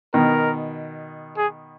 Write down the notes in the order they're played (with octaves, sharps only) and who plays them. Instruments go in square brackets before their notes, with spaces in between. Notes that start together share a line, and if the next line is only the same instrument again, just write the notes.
[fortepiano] B2 D#3 [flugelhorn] A#4
[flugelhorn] G#4